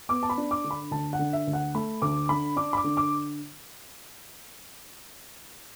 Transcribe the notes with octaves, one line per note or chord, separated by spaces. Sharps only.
B3 D6
A5
B5
D4
D6
D3
B5
D2 A5
F#5
D3
E5
D2
F#5
A3 B5
D2 D6
D3 B5
D4 D6
B5
D6
D3
D6